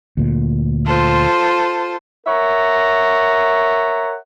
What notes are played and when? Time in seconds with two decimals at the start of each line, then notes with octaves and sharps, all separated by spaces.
0.17 D2 A#2
0.86 F4 A4 C5
2.27 A#4 C#5 E5 F#5 A#5